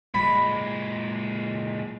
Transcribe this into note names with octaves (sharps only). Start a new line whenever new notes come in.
A#2 G#3 B5